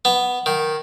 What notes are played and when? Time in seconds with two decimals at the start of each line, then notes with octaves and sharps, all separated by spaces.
0.05 B3
0.46 D#3